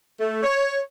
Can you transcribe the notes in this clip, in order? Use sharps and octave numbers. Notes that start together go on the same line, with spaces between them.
A3
C#5